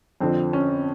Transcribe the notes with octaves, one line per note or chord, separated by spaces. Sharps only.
F2 D3 F3 C4
C#4